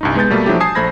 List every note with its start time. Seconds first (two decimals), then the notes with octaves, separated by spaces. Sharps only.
0.01 C2 G2 D#4
0.15 G#3 B3 B4 G6 A6
0.30 B2 G3 A3 A#3
0.46 F3 F#3 A3 D4 E4 G4
0.60 G#5 A5 D#6 G#6 C7
0.75 A#1 A3 C5 B5 G#6 A#6